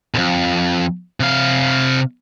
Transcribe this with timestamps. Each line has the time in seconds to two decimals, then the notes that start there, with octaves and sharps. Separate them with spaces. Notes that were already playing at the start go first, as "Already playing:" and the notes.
0.14 B1 F2
1.20 C3 F5